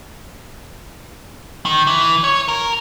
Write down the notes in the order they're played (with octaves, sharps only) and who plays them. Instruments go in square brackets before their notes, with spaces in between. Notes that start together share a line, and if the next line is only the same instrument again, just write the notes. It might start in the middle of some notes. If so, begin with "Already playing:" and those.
[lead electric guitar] D#3
E3
C#5
A#4